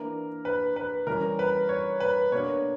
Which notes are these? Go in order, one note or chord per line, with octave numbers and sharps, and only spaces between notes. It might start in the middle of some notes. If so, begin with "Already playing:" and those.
Already playing: E3 A#3 D4 A#4
B4
B4
E3 G3 C#4 A#4
B4
C#5
B4
B2 A#3 D4 C#5